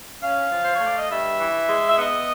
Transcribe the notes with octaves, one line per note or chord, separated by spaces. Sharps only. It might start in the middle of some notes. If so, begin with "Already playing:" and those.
C#4 F5
F3
C5
C#5
A3
D5
D#5
G2 E5
E3
G#3
E5
B3 D#5